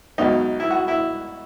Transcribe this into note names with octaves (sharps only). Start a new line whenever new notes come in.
C#2 B2 F#3 D#4
E4
F#4
E4